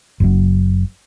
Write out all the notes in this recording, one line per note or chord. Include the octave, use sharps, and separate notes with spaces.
F#1 F#2